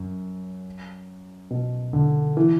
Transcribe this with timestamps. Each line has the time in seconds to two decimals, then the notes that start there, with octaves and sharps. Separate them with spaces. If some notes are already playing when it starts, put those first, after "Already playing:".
Already playing: F#2
1.51 B2
1.93 D3
2.37 E3